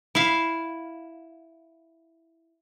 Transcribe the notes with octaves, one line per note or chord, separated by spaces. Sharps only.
E4 F5